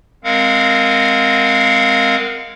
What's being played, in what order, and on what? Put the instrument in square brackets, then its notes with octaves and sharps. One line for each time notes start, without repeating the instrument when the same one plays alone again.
[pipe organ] G#3 C4 A#4 F5 F#5